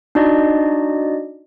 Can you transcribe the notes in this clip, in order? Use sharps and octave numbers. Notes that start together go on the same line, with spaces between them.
D4 D#4 F#4 D5 D#5